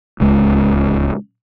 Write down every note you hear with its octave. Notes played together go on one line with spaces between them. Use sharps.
D1 C#2 G#3